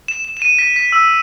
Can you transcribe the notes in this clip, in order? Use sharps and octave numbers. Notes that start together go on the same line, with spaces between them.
E7
E7
E7
D#7
B6
B6
E6